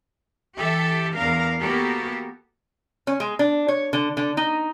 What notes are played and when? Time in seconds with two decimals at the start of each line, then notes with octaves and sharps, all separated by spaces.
0.56 E3 G4 A4 E5
1.14 E2 B3 D4 A#4 F5
1.60 A#3 B3 F#4 G4 A4 A#4
3.07 C#4
3.20 G#3
3.39 D4
3.68 C#5
3.93 D3
4.17 D3
4.37 D#4